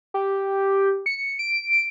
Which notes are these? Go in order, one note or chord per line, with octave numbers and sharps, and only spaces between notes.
G4
C#7
D7